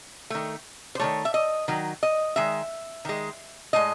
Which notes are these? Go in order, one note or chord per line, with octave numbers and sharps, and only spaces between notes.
D#3 A3
C5
D#3 F#3 A3 C#5
E5
D#5
D#3 F#3
D#5
D#3 G#3 E5
D#3 G#3
A2 G#3 D#5